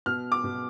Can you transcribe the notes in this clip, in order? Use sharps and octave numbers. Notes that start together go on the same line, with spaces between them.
B2 F6
D6
B2